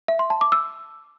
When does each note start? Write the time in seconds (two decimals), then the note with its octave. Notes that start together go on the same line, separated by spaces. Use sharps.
0.08 E5
0.19 C6
0.30 A5
0.41 D6
0.52 E6